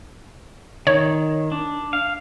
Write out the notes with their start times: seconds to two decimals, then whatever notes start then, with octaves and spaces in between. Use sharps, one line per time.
0.87 D#3 C#5
1.52 D4
1.93 F5